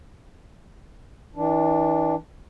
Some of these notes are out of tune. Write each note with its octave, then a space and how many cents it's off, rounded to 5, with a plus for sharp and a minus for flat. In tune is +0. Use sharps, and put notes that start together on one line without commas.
E3 -35 D4 +0